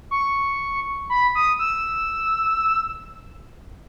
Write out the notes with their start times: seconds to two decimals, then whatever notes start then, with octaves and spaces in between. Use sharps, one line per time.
0.11 C#6
1.10 B5
1.35 D#6
1.59 E6